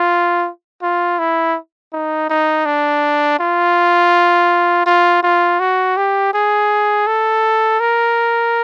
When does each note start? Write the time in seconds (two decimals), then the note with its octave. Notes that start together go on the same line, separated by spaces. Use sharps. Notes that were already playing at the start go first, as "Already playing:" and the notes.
Already playing: F4
0.82 F4
1.19 E4
1.93 D#4
2.30 D#4
2.66 D4
3.39 F4
4.86 F4
5.23 F4
5.60 F#4
5.97 G4
6.34 G#4
7.07 A4
7.80 A#4